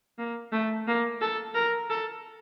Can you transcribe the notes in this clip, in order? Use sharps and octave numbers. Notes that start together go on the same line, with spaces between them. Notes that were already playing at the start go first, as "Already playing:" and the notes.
A#3
A3
A#3
A4
A#4
A4